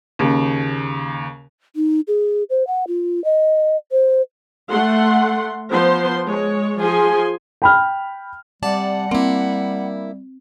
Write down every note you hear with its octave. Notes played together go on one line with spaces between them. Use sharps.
D#2 C#3
D#4
G#4
C5
F#5
F4
D#5
C5
A3 F#5 C6
F3 B3 C5 C6
G#3 C#5
F3 G#4 G#5 C6
G5 B5 F6
C3 G3 D5 F#5 A5
A#3 C4 E4